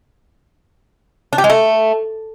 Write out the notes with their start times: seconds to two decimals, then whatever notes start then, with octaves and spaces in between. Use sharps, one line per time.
1.33 D4
1.38 G4
1.44 G#3
1.50 A3